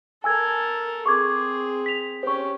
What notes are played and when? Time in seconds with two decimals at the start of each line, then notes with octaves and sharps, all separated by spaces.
0.24 A4 A#4 G#5 E6 G#6
1.06 C4 G#4 C#6 D6 G#6
1.86 B6 F7
2.23 C#4 G4 C5 C#6